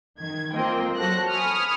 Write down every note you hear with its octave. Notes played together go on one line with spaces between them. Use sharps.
D#3 G#6
A#3 C4 F4 C5 D#5 G5
F#3 F#4 A4 C5 F#6 A#6
G#5 B5 C#6 D#6 F6